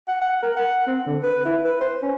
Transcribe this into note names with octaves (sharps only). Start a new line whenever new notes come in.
F#5
F#5
A#4
F#5
C4
D3
B4
E4
B4
C5
C#4